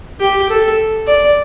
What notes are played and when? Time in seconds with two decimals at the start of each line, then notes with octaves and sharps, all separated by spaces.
0.20 G4
0.50 A4
1.07 D5